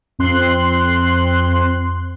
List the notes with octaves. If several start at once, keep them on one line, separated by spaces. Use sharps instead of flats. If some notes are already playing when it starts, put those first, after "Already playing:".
F2 C4 C6 F#6